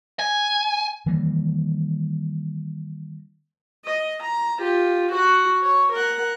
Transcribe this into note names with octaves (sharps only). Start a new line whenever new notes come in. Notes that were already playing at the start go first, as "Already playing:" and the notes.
G#5
D#3 E3 G3 A#3
D#5
A#5
F4 G4
F#4 F#5
C#5
A#4 F#5